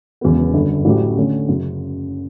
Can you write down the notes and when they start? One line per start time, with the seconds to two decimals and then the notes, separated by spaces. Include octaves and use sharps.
0.21 E1 E2 C#3 F#3 B3
0.54 G1 F#2 D3
0.85 A1 A2 F#3 C#4 G4
1.17 D3 A3 C#4
1.48 F#1 F#2 C#3